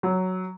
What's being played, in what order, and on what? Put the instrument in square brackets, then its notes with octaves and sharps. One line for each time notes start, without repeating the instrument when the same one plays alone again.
[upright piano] F#3